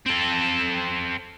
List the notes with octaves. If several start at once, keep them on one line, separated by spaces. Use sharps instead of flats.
C4 A4